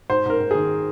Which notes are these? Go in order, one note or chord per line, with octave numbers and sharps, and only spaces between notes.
G#2 C5
G#2 A#4
G#2
D#3 G#4